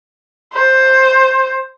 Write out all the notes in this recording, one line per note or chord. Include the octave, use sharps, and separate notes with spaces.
C5